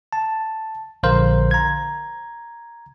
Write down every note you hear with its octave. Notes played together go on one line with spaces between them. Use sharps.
A5
A#1 D3 A#4 C5 F5
A#5 G#6